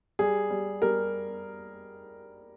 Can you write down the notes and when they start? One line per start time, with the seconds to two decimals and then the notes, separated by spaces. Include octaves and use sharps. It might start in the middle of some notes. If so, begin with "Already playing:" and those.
0.19 G3 G#4
0.50 G3
0.82 G3 A#4